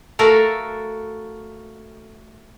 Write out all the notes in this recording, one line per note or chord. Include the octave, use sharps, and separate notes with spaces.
A3 F#4 A4 A#4 F5